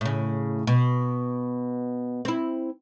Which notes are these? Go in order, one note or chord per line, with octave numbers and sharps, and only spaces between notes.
A2 C#3
B2
C4 E4